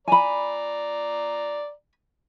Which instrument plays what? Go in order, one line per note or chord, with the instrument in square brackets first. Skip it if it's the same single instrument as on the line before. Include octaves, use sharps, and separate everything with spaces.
[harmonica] D5 A#5 [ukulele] G#5 B5